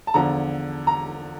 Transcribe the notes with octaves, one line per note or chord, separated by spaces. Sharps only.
A5
E2 D3 F3 A#5
A#5